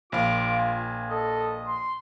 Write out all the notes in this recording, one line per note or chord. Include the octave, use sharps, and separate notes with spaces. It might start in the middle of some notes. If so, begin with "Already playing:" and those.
A#1 F4 F5 D6
G#5
A4 D#5
C6